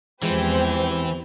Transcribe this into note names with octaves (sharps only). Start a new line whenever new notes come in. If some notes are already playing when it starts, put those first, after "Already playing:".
E2 E3 F3 G#3 C4 G4 C5